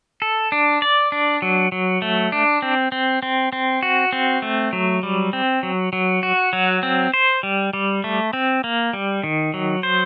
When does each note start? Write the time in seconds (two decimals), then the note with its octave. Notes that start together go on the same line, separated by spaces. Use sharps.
0.22 A4
0.52 D4
0.82 D5
1.12 D4
1.42 F#3
1.72 F#3
2.02 A3
2.32 D4
2.62 C4
2.92 C4
3.23 C4
3.53 C4
3.83 F#4
4.13 C4
4.42 A3
4.73 F#3
5.03 G3
5.33 C4
5.63 F#3
5.93 F#3
6.23 F#4
6.53 F#3
6.83 C4
7.14 C5
7.43 G3
7.73 G3
8.04 A3
8.33 C4
8.64 A#3
8.93 G3
9.24 D#3
9.54 F#3
9.83 C5